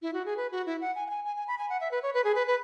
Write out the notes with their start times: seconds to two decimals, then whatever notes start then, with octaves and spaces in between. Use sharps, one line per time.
0.02 E4
0.13 F#4
0.25 G#4
0.37 B4
0.52 F#4
0.66 E4
0.81 F#5
0.95 G#5
1.07 F#5
1.10 G#5
1.25 G#5
1.36 G#5
1.47 B5
1.58 G#5
1.69 F#5
1.81 E5
1.91 B4
2.03 C#5
2.14 B4
2.24 G#4
2.35 B4
2.47 B4